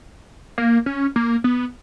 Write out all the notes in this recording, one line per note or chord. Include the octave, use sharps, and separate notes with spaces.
A#3
C#4
A#3
B3